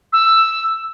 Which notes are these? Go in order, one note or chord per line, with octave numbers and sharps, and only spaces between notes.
E6